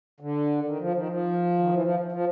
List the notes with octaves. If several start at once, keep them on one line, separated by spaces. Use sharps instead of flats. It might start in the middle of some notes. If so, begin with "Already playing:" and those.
D3
D#3
F3
D#3
F3
D#3
E3
F3
F3